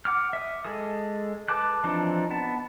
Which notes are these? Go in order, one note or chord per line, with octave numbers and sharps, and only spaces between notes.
F#5 D6 F6
E5 D#6
G#3 G#4 A4 D#6
B4 A5 D6 F#6
E3 F3 C4 D4 D#4
B3 A5